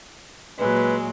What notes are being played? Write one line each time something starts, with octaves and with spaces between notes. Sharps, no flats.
A#2 F#3 G#3 B4